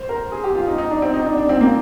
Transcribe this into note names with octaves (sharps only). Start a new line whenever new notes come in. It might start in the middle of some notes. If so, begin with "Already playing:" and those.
Already playing: C5
A#4
G#4
G4
F4
D#4
D#4
D4
C4
D#4
D4
D4
C4
A#3